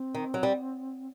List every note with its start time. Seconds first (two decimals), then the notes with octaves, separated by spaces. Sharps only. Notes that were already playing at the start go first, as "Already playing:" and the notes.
Already playing: C4
0.14 D#3
0.34 F#3
0.43 G3